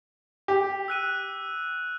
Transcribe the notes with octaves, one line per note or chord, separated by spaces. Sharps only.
G4
E6 F#6 D#7